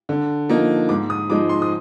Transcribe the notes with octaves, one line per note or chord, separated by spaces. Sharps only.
D3
F3 A#3 D#4
G#2 D6
D#6
F3 G#3 D#4 D6
C6
D#6